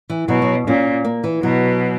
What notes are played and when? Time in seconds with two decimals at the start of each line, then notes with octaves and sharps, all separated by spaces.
0.10 E3
0.28 B2 F#3
0.42 F#3
0.67 A#2 C#4
1.04 A#3
1.24 E3
1.43 B2 F#3